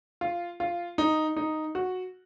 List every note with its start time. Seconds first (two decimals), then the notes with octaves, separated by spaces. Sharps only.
0.21 F4
0.60 F4
0.98 D#4
1.36 D#4
1.75 F#4